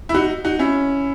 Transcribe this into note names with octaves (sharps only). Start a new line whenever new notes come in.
E4
D#4 F#4
D#4 F#4
C#4 E4